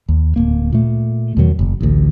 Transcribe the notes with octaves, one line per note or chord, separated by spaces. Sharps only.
D#2
D1 A#3
A#2 A3
E2 B2 D#3 F#3
F#1
A1 D2